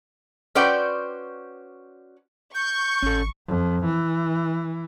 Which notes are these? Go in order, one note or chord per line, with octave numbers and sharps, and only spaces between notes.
C#4 F#4 B4 C5 D5 G5
C#6 G6
G#1 C#4 A4
F2
E3